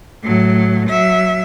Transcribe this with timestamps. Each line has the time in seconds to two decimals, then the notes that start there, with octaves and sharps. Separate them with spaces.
0.24 A2 F#3
0.88 F#3 E5